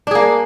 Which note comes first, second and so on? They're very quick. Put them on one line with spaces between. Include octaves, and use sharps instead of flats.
D4 G#4 A#3